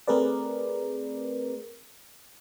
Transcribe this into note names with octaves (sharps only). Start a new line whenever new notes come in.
A3 C4 G#4 A#4 B4 D5